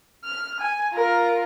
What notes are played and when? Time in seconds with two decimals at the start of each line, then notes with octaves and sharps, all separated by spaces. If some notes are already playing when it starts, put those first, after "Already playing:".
0.25 F6
0.60 G#5
0.93 F4 A#4